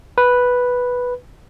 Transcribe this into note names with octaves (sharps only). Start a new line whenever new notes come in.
B4